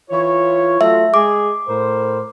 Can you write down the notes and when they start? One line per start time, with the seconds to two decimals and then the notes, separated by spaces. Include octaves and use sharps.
0.10 E3 F4 C#5
0.81 F#3 A3 F4 E5
1.14 G#3 G#4 D6
1.68 A2 A#4 C5